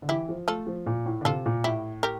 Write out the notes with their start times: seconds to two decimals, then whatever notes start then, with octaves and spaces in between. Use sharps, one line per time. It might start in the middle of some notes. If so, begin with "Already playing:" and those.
0.02 D3
0.09 E3 E4 G4
0.29 F3
0.48 A3 F4 A4
0.67 F3
0.86 A#2
1.06 A2
1.21 D3
1.25 C3 F4 A4
1.46 A#2
1.64 A2 E4 G4
2.03 G4 A#4